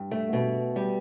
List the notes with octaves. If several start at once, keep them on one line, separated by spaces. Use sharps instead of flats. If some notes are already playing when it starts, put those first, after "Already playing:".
Already playing: G2
A3
B2
G3